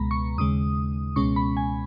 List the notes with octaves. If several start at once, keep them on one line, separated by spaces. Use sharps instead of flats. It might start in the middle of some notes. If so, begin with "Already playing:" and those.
Already playing: C#2 B2 G#3 B3 A#5 B5
C#6
D#2 C#3 G#3 D#6
C#2 B2 G#3 C#4 C#6
B5
G#5